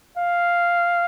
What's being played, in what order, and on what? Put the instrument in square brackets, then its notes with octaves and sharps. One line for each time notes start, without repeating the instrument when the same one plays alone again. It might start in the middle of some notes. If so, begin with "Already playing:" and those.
[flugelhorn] F5